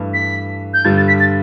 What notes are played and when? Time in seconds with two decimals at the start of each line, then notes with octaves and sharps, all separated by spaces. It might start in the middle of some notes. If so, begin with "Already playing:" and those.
Already playing: G2 E3 A3
0.14 B6
0.74 G6
0.85 G2 D3 G3 A6
0.96 A6
1.08 B6
1.20 A6